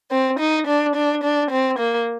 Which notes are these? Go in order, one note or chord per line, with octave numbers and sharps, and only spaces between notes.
C4
D#4
D4
D4
D4
C4
A#3